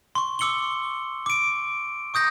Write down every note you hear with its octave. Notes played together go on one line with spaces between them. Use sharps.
C6 C#6
D6 E6 C#7 F#7 G7
D6 D7
C#6 D#6 G6 A#6